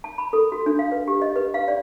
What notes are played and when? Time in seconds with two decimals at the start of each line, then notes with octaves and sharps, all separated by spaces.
0.04 A5
0.18 B5
0.33 A4
0.52 F#4
0.66 D4
0.79 F5
0.92 B4
1.08 G4
1.22 D#5
1.36 B4
1.54 F5
1.68 D5